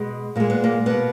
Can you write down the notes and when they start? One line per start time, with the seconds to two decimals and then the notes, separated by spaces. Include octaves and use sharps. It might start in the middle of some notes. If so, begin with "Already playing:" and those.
Already playing: B2 G#3
0.36 A#2 G#3 A#3
0.50 B3
0.64 A#3
0.86 B2 A#3 B3